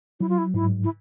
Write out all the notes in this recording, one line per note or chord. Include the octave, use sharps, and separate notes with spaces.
F#3 E4
F4
E4
G#2 E4
E4